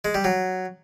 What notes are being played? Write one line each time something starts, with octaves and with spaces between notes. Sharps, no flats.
G#3
G3
F#3